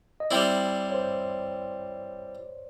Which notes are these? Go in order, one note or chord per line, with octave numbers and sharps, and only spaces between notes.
D#5
G3 C4 E4 D5
C#5
C5